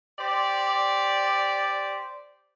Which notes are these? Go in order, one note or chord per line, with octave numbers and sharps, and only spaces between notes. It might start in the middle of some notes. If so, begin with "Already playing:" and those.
G4 C5 D5